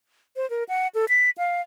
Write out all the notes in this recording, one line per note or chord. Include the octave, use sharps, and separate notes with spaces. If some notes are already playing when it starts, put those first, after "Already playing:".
C5
A#4
F#5
A4
B6
F5